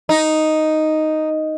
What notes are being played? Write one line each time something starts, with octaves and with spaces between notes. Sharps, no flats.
D#4